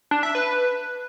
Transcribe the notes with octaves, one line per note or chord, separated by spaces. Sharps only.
D4
E5
B4